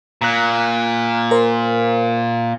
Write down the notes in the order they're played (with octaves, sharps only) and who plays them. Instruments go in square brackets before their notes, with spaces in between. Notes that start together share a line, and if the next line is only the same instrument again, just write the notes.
[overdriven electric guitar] A#2 [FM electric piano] A#5 F#6
[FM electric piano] A#4 C5